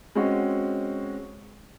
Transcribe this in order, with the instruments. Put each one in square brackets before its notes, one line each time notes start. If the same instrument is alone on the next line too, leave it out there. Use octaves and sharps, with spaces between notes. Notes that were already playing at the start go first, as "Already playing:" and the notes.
[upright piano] G#3 C4 C#4 F#4